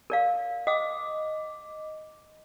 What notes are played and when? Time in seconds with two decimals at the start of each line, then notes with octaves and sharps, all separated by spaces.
0.10 A#4 D5 F5
0.67 D#5 D6 D#6